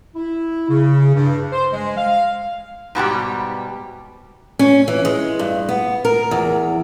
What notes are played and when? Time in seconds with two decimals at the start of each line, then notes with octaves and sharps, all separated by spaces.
0.16 E4
0.70 C#3
1.14 G2
1.53 C5
1.72 G#3
1.98 F5
2.95 G#2 B2 G3 G4
4.59 C#4
4.88 E3
5.05 G#3
5.39 G2
5.69 B3
6.05 A#4
6.31 E2